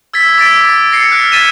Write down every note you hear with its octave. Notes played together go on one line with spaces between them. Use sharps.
E6 G#6 A6 B6
D6 E6 A6 B6 D7
A6 A#6 C7 C#7
F6 F#6 A#6 D7
G#6 A6 B6 D#7 E7